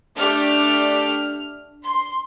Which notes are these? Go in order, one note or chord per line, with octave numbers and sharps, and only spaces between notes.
A3 D4 G4 F6
C6